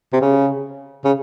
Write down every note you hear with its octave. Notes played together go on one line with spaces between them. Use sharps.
C3
C#3
C#3